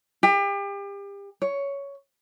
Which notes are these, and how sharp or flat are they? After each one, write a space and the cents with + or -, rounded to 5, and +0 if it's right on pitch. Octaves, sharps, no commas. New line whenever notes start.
G4 +35
C#5 +10